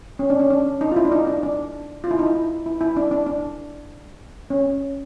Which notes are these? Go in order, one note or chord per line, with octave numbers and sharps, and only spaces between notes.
C#4
D4
C#4
D4
D#4
F4
E4
D4
D#4
D4
D4
F4
E4
D#4
E4
E4
E4
D4
D4
D4
C#4